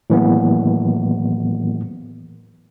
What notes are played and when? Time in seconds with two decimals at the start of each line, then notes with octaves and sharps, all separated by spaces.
0.10 A2 D#3 E3 F#3 A#3 B3